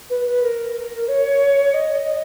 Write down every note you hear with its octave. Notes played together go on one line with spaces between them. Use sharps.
B4
B4
A#4
C#5
D#5